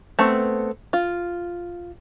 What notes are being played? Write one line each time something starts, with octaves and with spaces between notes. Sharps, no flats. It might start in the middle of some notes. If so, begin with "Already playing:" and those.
A3 B3 C4
F4